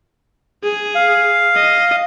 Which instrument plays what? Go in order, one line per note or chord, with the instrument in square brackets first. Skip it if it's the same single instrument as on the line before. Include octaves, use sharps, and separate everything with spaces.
[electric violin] G#4
[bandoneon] F5
[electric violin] D#5